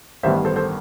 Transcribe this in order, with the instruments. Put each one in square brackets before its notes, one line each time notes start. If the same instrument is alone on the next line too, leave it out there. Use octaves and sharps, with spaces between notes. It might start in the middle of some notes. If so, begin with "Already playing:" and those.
[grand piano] A1 G2 D#3 G3 B3 C5 E5
A4 C5
A4 C5